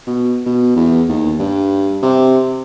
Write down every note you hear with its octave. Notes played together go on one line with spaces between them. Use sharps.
B2
B2
E2
D#2
G2
C3